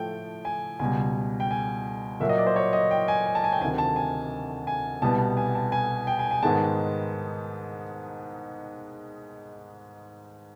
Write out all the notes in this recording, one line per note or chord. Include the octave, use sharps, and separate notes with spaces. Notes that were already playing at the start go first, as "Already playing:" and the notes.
Already playing: A2 F3 A3 G5
G#5
C#2 B2 G3 G#5
G5
G#5
A#2 F#3 A#3 E5
D#5
D5
C5
C#5
D#5
G5
G#5
G#5
A5
G#5
G5
D2 C3 D#3 G#5
A5
G#5
G#5
C2 B2 G3 B3 A5
G#5
A5
G#5
G5
G#5
G#5
G#2 D#3 G#3 B3 A5